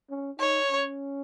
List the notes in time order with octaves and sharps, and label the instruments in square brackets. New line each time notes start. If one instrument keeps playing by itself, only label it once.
[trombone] C#4
[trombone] D#4 [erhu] C#5
[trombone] C#4